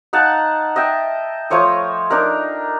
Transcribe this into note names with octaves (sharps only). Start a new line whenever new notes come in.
D#4 F5 F#5 A5
D#5 E5 G5
F3 A3 C#5 D#6
D4 D#4 A#4